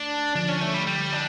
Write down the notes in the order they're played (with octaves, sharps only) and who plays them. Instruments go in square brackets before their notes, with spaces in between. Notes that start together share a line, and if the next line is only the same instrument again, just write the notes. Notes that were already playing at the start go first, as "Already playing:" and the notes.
Already playing: [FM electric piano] A3 [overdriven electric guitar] D4
[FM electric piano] D3 F3 [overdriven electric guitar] D4
[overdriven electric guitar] C#4
A3
G3
G3
D4